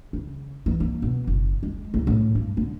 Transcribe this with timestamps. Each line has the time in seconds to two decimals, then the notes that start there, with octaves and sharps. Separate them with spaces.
0.13 C#3
0.66 E3
0.80 A#3
1.02 B2
1.27 F#1
1.63 G#3
1.94 C2
2.07 A2
2.35 G2
2.57 D3